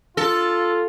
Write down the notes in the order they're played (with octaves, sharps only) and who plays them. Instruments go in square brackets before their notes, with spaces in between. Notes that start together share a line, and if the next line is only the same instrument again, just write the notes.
[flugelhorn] F4 [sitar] A4